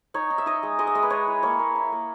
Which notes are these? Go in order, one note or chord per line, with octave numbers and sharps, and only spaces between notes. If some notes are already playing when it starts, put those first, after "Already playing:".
D#4 C#5
D#4
E5
D#4 D#5
G#3
G#3 D#5
E5
G#3 D#5
B4
G#3 C#5
E4
A#3 C#5
A#3
E4
A#3